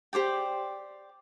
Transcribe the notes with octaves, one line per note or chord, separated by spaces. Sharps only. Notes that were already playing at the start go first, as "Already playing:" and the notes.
G4 C5 D5 G5